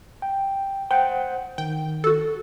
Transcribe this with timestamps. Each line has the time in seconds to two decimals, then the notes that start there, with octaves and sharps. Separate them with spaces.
0.22 G5
0.91 C5 F#5 G5
1.58 D#3 G5
2.04 F#4 A4